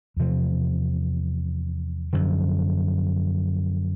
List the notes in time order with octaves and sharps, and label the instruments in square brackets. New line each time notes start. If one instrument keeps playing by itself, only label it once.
[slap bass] E2 C3 F3
F#2 D3 F3